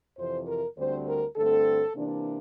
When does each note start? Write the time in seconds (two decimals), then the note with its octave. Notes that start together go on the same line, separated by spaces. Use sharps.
0.17 F2 C3 E3 C5
0.47 A#4
0.77 D2 D3 G3 C4 C5
1.07 A#4
1.36 G2 D3 A3 C4 A4
1.94 C3 E3 A#3 D4